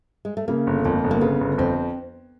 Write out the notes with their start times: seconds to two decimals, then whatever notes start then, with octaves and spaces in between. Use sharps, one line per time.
0.25 G#3
0.37 A3
0.48 C#3 A#3
0.67 G1
0.84 F2 A#3
1.04 G1
1.11 A#3
1.21 C#3 B3
1.41 G1
1.58 F2 C4